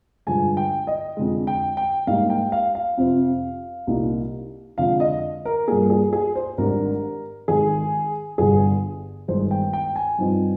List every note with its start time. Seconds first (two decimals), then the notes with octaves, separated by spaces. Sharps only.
0.27 G2 D3 F3 G#3 G#5
0.57 G5
0.87 D#5
1.17 F2 D3 G#3
1.47 G5
1.77 G5
2.07 G#2 G3 A#3 D#4 F5
2.30 G5
2.52 F5
2.75 F5
2.97 F2 C3 F3 C4
3.87 C2 A#2 G3 A#3 D#4
4.78 F2 D3 F3 G#3 F5
5.00 D#5
5.45 A#4
5.68 G2 F3 A#3 G#4
5.90 G#4
6.13 G#4
6.35 C5
6.58 G#1 G#2 G3 D4 A#4
7.48 G#1 G#2 D#3 G#4
8.38 G1 G2 D3 G#4
9.28 G1 G2 D#3 G#3 C5
9.51 G5
9.73 G5
9.96 G#5
10.19 G2 F3 C4 D#4